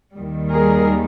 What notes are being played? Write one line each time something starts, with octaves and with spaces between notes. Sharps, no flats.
D#2 D#3 G3
G#4 A#4